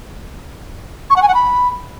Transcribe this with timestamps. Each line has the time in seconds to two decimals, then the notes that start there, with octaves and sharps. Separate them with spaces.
1.10 C#6
1.16 F#5
1.22 G#5
1.28 F#5
1.34 B5